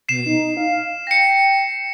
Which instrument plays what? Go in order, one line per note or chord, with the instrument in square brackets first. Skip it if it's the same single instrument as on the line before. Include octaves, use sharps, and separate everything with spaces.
[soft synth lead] B2 [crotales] C7 E7
[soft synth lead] D#4
F5
[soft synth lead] G5 [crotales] A#6 C#7